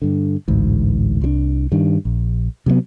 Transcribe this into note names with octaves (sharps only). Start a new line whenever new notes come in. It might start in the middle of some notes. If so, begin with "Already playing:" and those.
G2 D3
A1 D2 G#2
C2 F3 D4
G2 D#3
A#1
C3 F#3 A3 B3